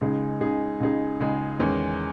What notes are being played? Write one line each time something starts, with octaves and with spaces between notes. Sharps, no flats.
C#2 C#3 G#3 D#4 G#4
C#2 C#3 G#3 D#4 G#4
C#2 C#3 G#3 D#4 G#4
C#2 C#3 G#3 D#4 G#4
E2 D#3 G#3 C#4